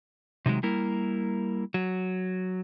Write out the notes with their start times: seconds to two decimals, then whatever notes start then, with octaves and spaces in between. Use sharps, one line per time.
0.46 C3 D#3 F#3 G#3
0.63 G3 A#3 E4 A#4
1.74 F#3